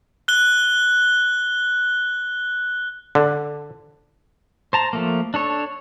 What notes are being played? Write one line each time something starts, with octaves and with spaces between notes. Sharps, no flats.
F#6 G7
D3
C5 A5 A#5
F3 A3 A#3
D4 A4 C#5